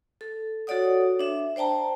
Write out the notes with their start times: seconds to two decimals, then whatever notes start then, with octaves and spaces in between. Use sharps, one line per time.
0.21 A4
0.67 F#4 A4 C#5 D5 F#5 D#6
1.19 D4 E5
1.56 C5 D5 G5 A5 A#5